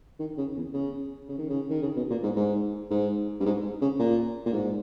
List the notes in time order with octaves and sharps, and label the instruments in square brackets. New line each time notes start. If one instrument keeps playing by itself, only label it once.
[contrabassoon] D#3
C#3
E2
C#3
C#3
D#3
C#3
D#3
C#3
B2
A#2
G#2
G#2
G#2
G2
G#2
C#3
A#2
A#2
G#2